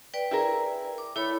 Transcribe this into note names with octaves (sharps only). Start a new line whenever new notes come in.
B4 D5 G5
E4 G#4 A#4
D6
A3 E4 C#5 B5